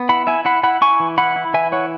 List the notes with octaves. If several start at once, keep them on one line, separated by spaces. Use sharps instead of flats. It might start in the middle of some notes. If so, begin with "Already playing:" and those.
Already playing: B3
E4 F#5 B5
E4 E5 G#5
E4 F#5 B5
E4 F#5 B5
E4 G#5 C#6
E3
E4 F#5 B5
E4
E3 E5 G#5
E4 C#5 F#5